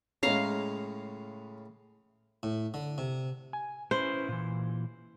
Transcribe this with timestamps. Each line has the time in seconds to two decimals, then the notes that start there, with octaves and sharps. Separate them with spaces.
0.23 A2 C#3 G#3 C#4 F5 A#5
2.43 A2
2.74 D3
2.98 C3
3.53 G#5
3.91 C#4 E4 B4 C5
4.28 A#2 E3